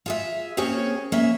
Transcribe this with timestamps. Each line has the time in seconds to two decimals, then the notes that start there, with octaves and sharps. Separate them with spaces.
0.06 F4 G#4 E5
0.57 A#3 C4 C#4 G#4 C#5
1.12 A#3 C#4 E5